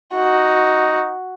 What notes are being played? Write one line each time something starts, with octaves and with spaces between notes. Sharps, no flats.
D#4 F#4